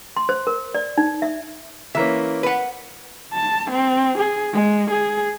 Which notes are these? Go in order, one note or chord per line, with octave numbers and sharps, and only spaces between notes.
C6
C5
A#4
D5
D#4
E5
E3 A#3 C#4 E5
B4 F#5
A5
C4
G#4
G#3
G#4